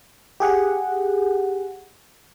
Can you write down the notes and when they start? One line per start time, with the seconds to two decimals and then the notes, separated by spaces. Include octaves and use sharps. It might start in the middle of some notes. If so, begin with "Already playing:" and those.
0.40 G4 G#4 F#5